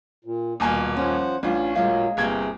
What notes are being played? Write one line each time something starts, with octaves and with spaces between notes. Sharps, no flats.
A#2
D#1 B2 A#3 G#5
F3 C#4 C5 F#5
A1 C#4 D4 F4
A#2 F#3 G#3 D#5 F5
G1 C3 A#3 G#4 G#6